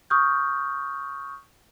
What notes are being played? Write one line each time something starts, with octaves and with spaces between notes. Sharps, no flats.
C#6 D#6 F6 G6